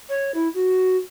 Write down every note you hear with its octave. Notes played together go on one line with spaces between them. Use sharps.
C#5
E4
F#4